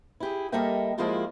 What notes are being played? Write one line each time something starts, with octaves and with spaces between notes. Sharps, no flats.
E4 G4 G#4
G3 A#3 A4 D#5 E5 G5
F3 G#3 A#3 E4 F4 G4